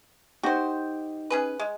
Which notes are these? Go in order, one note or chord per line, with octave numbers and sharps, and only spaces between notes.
D#4 F#4 G4 C5
C#4 G#4 B4
G#3